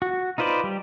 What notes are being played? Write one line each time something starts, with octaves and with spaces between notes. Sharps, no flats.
F#4
D#4 F4 B4 C5 D5
G3 G4